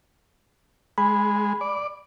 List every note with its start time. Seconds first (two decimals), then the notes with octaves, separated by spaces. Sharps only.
0.98 G#3 B5
1.61 D5